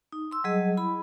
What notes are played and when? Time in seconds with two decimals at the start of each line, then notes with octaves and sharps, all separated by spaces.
0.12 D#4
0.31 C6 E6
0.44 F#3 G3 G#4 D#5
0.77 E4 B5